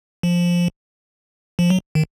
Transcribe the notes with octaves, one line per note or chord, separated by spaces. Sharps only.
F3
F3
F#3
D#3